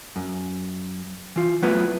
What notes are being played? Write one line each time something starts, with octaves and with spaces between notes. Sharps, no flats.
F#2
E3 F4
F#3 A3 B3 E4 F4 B4